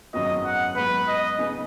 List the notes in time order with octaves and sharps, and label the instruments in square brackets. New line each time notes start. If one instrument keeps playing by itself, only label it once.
[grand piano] G#1 F#2 F#3 B3 F#4 [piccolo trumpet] D#5
[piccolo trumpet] F#5
[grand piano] G#2 F#3 B3 [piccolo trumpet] B4
[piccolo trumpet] D#5
[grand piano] C#3 B3 D#4 G#4 B4